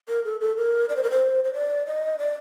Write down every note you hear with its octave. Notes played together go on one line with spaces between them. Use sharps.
A#4
A4
A4
A#4
D5
C5
A#4
C5
C5
D5
D#5
D5